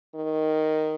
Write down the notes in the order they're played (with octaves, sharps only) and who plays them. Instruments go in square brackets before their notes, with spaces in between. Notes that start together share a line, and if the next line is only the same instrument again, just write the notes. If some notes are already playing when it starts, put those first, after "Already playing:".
[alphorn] D#3